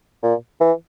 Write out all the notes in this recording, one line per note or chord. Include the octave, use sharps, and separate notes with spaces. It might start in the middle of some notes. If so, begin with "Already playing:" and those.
A#2
E3